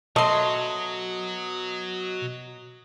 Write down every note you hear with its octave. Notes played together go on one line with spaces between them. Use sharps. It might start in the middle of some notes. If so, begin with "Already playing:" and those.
B2 F#3 A3 D#5 C6